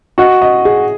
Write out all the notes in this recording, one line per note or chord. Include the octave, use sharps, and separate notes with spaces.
F#4 D#5
D#5
G#4